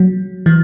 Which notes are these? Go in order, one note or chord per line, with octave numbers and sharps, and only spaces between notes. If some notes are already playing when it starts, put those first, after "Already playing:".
Already playing: F#3
E3